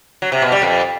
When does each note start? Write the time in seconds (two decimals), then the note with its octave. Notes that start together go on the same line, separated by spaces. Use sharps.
0.22 F#3
0.32 C3
0.42 B2
0.52 G3
0.62 F2